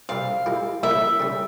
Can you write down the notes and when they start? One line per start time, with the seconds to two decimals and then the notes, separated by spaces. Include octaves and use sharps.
0.09 C3 G3 C4 F5
0.46 G#3 E4 G4
0.83 C#3 G3 A#3 E4 E5
1.20 C#3 G3 C#4